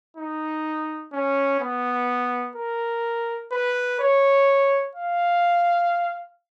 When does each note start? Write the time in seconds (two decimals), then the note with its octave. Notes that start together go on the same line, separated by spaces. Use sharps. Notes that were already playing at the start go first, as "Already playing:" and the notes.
0.17 D#4
1.13 C#4
1.60 B3
2.56 A#4
3.52 B4
4.00 C#5
4.96 F5